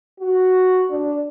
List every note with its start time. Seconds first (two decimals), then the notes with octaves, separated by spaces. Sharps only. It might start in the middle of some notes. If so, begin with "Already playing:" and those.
0.20 F#4
0.91 D4